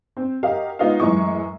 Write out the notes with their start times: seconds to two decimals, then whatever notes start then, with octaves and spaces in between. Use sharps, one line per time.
0.17 C4
0.43 F#4 G4 A#4 D#5 F5
0.79 G#3 B3 D#4 F4 F#4 F5
1.00 F#2 A2 E3 G#3 C#6